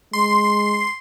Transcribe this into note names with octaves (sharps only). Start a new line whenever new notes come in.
G#3 C6